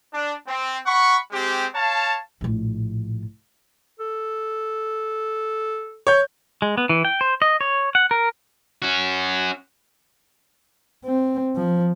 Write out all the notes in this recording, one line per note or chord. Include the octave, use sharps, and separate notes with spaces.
D4
C4
F#5 B5 C#6
G#3 C4 G4
C#5 F5 A5
A#1 A2
A4
C#5 G6
G#3
B3
E3
G5
C5
D#5
C#5
F#5
A#4
C#4 F#4
C4
F3